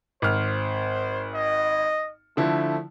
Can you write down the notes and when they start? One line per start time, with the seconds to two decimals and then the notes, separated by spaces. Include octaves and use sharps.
0.22 G#1 C5 F6
1.34 D#5
2.37 D3 F3 A3 E4